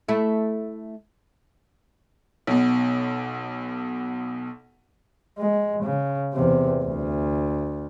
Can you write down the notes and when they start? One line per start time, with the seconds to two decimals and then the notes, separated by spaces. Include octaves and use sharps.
0.08 A3 E4
2.47 B1 B2
5.39 G#3
5.83 C#3
6.34 E2 C3
6.83 D2